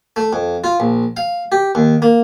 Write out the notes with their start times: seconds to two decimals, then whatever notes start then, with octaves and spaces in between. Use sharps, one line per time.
0.16 A3
0.33 F2
0.64 F4
0.80 A#1
1.17 F5
1.52 G4
1.75 D#2
2.02 A#3